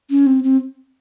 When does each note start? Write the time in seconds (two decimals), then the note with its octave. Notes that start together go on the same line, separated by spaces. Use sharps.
0.10 C#4
0.27 C4
0.44 C4